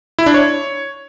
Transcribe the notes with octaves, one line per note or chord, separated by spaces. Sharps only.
E4
D4
C#5